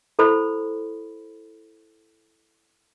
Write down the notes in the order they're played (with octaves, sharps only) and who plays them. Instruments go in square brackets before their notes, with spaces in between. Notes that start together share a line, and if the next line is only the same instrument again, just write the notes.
[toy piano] E4 A4 C5 B5